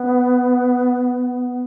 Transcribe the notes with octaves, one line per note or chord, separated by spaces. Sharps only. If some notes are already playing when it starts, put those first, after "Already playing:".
Already playing: B3